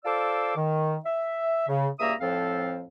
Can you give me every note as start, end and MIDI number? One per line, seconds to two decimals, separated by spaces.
0.05 0.54 65
0.05 0.54 69
0.05 0.54 72
0.05 0.54 74
0.05 0.54 86
0.05 0.54 88
0.56 0.96 51
1.05 1.66 76
1.68 1.88 49
1.99 2.14 37
1.99 2.14 43
1.99 2.14 58
1.99 2.14 76
1.99 2.14 82
1.99 2.14 87
2.21 2.84 41
2.21 2.84 45
2.21 2.84 53
2.21 2.84 60
2.21 2.84 69
2.21 2.84 77